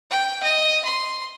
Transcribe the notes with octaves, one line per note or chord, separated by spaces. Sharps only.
G5
D#5
C6